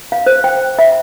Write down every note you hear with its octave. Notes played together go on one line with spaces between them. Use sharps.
F5
C5
G5
E5